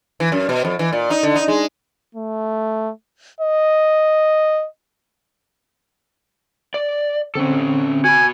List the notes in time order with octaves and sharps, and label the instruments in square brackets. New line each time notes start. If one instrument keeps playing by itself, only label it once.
[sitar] E3
F#2
B2
F2
E3
A#2
D#4
D3
D#4
G#3
[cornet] A3
D#5
[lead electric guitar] D5
[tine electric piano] D3 C4 [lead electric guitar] C#4 A4
[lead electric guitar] F#4 B5 [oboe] G#5